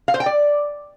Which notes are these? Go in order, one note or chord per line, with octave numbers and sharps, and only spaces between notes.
F5
C5
G5
D5